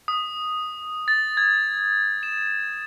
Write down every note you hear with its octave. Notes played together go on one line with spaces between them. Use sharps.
D#6
A6
G#6
E7